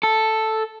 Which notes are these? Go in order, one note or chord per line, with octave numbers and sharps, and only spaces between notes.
A4